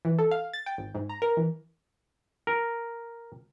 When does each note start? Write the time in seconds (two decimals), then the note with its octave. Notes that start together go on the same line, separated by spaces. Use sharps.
0.05 E3
0.19 A4
0.31 F5
0.53 A6
0.66 G5
0.78 G#1
0.95 G#2
1.09 A#5
1.22 A#4
1.37 E3
2.47 A#4